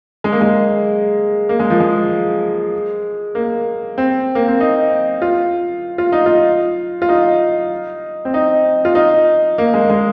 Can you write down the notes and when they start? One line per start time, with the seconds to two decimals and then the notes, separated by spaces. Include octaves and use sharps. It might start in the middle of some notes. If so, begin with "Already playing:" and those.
0.24 G#3
0.32 A#3
0.41 G#3
1.49 A#3
1.59 G#3
1.70 F3
1.80 G#3
3.35 A#3
3.98 C4
4.35 A#3
4.48 C4
4.60 D#4
5.22 F4
5.98 F4
6.12 D#4
6.26 F4
7.02 F4
7.09 D#4
8.25 C4
8.34 D#4
8.85 F4
8.95 D#4
9.58 A#3
9.74 G#3
9.90 G#3